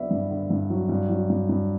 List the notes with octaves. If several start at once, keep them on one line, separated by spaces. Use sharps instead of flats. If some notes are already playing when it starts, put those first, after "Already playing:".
Already playing: D3 F#3 B3 D5 E5
G2
D3
G2
F#3
G2
F#3
G2
G2